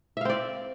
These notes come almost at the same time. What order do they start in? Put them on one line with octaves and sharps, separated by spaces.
E5 F5 C4 D5